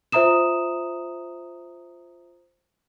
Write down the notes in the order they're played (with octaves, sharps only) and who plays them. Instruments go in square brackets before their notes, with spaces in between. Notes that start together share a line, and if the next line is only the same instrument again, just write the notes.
[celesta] F4 C5 E5 A#5 D#6 E7